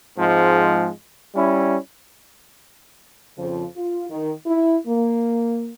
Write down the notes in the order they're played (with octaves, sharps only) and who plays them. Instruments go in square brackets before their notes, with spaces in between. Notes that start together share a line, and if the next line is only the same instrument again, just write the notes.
[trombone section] G#2 F3 G#3 C4
G3 C#4 E4
[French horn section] F2 C#3 F3
F4
D#3
E4
A#3